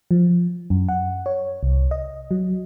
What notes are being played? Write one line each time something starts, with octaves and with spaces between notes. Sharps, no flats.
F3
F#2
F#5
C#5
C2
D#5
F#3